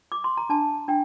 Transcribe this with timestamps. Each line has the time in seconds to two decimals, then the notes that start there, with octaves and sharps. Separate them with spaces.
0.12 D6
0.24 C6
0.37 A#5
0.50 D4 A5
0.88 D4 G5